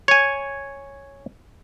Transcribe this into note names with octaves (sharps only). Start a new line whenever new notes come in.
C#5 G#5